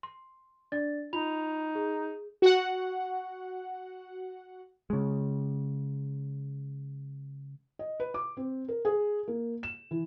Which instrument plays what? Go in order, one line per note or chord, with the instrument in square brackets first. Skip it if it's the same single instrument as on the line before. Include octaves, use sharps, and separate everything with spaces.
[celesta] C6
D4 D5 A6
[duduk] D#4 [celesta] F4 B5 F7
[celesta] G#4
[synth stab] F#4 F#5
[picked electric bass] C#3 G#3
[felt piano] D#5
B4
D6
C4
A#4
G#4
A#3
E7
E3